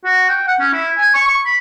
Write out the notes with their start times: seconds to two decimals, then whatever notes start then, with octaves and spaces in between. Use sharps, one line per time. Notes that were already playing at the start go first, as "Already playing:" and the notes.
0.05 F#4
0.29 G5
0.47 F#5
0.60 C#4
0.73 E4
0.98 G#5
1.14 C#6
1.28 C#6
1.46 B5